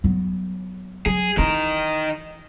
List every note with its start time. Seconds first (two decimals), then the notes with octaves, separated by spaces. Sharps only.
0.04 F#3 B3
1.06 F#3 G#4
1.37 D#3 E3 E4 A#4